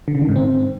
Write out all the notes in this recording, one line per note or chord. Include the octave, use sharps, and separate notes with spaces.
D3
C#3
D#3
G#2
C4